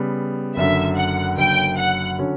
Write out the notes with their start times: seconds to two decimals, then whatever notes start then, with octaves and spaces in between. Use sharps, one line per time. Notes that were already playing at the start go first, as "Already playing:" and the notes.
Already playing: C#3 G3 B3
0.57 F#1 F#2 D3 E5
0.97 F#5
1.37 F#1 F#2 D3 G5
1.77 F#5
2.19 D3 F#3 C#4